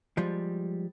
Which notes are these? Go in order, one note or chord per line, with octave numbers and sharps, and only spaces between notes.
F3 G3 G#3